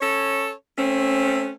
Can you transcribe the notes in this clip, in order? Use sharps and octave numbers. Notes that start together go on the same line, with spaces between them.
C#4 A4 C#5
A3 C4 C#4